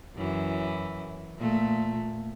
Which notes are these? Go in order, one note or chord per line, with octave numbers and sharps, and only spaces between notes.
F#2 E3
A#2 A3